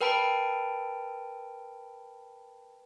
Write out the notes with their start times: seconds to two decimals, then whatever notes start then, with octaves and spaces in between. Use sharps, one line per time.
0.01 A#4 B4 G5 A5 B5 D7